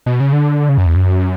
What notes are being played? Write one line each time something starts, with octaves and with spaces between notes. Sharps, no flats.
B2
C#3
D3
C#3
F#2
E2
F#2